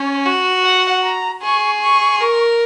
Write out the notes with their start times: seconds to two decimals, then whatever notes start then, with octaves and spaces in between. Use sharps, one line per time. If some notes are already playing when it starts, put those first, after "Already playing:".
Already playing: C#4 C#5
0.25 F#4
0.64 F#5
1.04 A#5
1.42 G#4 C#6
1.82 C#6
2.20 A#4